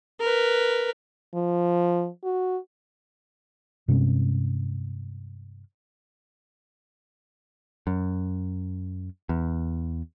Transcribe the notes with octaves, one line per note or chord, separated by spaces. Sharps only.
A#4 B4
F3
F#4
G2 C3 G#3 C#4
F#2
E2